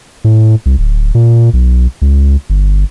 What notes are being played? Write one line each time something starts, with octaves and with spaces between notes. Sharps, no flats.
A2
C2
D1
A#2
B1
C#2
G1